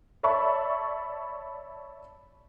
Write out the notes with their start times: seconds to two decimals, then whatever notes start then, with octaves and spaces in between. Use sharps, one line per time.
0.23 C#5 D5 E5 A5 B5 C#6